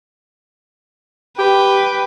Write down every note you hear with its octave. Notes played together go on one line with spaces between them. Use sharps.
G4 B4 G5